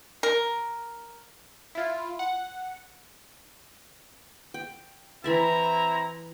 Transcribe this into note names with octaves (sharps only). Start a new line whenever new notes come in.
A#4
E4 F4
F#5
G5
E3 C4 E4 E5 A5 A#5